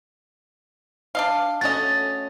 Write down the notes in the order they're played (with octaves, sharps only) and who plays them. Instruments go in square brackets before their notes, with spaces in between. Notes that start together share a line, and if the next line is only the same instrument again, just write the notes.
[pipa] D4 D#5 F5
[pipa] D3 D#5 [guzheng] A3 C#4 F#4 [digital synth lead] A6